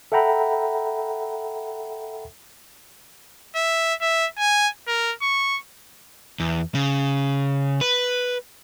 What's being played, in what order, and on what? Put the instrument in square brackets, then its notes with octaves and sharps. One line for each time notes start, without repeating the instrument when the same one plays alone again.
[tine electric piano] A4 E5 F#5 G5 A#5 B5
[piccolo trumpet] E5
E5
G#5
A#4
C#6
[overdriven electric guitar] E2
C#3
B4